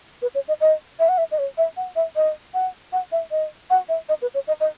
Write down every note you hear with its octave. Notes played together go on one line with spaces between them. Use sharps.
B4
C#5
D#5
D#5
E5
F#5
E5
D#5
C#5
E5
F#5
E5
D#5
F#5
F#5
E5
D#5
F#5
E5
D#5
B4
C#5
D#5
D#5